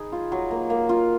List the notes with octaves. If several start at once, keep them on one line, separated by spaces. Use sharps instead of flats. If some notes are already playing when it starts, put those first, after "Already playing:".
Already playing: D#4 G#4 B4
F4
F#3
A#3
A#3
F4